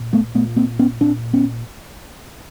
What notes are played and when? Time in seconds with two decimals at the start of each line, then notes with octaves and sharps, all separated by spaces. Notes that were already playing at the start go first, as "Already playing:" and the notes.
Already playing: A#2
0.13 A3 B3
0.34 A#2 A3 B3
0.56 A#3 C4
0.79 B3 C#4
1.00 A#2 C4 D4
1.33 B3 C#4